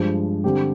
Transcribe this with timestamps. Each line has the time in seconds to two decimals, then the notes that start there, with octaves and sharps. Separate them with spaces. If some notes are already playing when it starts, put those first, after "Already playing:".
Already playing: G2 F3 G#3
0.44 D3 G3 C4 G4